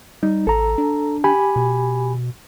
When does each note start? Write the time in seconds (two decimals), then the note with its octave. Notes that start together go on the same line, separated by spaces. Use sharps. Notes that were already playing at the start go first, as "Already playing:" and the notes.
0.23 G3 D#4
0.47 A1 A4 A#5
0.78 D4
1.24 G4 G#5 B5
1.56 B2